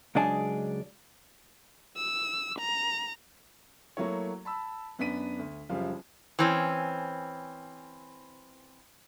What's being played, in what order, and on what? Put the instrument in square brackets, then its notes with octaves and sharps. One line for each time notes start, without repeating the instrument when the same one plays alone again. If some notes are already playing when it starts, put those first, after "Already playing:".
[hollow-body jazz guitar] C#2 F#3 G#3 D4 G#4 A5
[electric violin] E6
A#5
[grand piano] F#3 A3 A#3 E4 C#5
A5 B5 E6
F#2 B3 D4 B6 D#7
D2
F#1 F#2 F3 G3 F5
[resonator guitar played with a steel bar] E3 C4 C#4